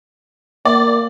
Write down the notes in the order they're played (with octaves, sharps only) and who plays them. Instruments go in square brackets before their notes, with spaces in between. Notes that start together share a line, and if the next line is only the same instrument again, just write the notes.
[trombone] A#3 [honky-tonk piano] D5